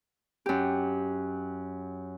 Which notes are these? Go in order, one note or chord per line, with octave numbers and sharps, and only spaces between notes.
F#2 G4